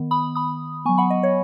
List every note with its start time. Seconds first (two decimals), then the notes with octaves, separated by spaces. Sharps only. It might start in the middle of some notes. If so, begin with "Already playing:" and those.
Already playing: D#3 B3
0.11 B5 D#6
0.35 B5 D#6
0.85 F#3 B3 G#5 C#6
0.98 F#5 B5
1.10 D#5
1.23 C#5